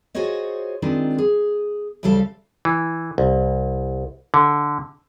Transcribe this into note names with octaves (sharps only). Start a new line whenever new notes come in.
F4 F#4 G#4 C5 C#5 D#5
D#3 G#3 C4 D4 D#4 F4
G#4
D2 C#3 G3 A4 F5 A5
E3
C2
D3